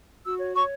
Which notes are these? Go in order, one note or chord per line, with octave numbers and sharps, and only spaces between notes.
F#4 E6
C#5
C#5 C#6